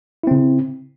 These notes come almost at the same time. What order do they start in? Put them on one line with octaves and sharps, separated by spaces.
E4 C4 C#3